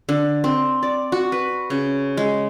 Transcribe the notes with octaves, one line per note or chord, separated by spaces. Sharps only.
D3
C4
D5
F#4
B4
C#3
G#3